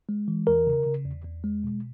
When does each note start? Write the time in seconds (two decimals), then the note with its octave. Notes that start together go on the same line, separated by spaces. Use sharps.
0.09 G#3
0.28 E3
0.47 E2 A#4
0.67 C#3
0.86 C#3
1.06 E2
1.25 E2
1.44 G#3
1.64 B2